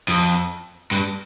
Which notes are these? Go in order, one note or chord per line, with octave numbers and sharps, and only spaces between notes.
F2
G2